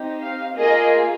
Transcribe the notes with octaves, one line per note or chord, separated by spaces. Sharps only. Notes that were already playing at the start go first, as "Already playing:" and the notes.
Already playing: C4 D#4 G4
F5
A#3 F4 G#4 D#5